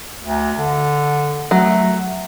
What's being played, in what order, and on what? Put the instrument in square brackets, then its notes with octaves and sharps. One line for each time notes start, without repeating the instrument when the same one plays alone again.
[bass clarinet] D2
D3
[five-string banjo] F#3 [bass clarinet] A3